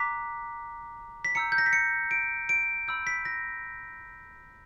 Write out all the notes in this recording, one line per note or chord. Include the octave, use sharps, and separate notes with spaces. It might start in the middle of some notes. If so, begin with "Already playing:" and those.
Already playing: A#5 D6 F#6 B6
B6
A#5 E6 G6 C#7
G6
A#6
B6
C#7
D7
D7
B5 E6 G6
B6
A#6